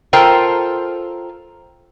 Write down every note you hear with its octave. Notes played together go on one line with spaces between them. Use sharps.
F4 A4 A#4 C5 G5